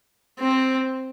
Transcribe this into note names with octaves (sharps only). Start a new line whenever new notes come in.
C4